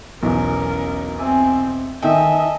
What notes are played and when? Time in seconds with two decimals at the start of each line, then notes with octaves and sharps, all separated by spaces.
0.23 B1 E2 C#4 A#4
1.18 C4 D5 E5 G#5
2.02 D#3 A4 D#5 E5 G5 G#5